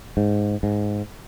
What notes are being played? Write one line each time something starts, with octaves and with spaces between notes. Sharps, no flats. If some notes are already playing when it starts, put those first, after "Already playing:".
G#2
G#2